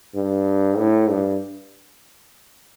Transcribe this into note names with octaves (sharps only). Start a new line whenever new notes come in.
G2
A2
G2